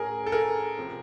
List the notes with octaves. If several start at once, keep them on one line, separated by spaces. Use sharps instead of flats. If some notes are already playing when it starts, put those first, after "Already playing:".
Already playing: A2 C#4 G#4 A#4
A4
G#4 A#4
C3 F3